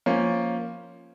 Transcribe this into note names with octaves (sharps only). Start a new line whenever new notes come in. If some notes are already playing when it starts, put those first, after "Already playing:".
F3 A#3 C#4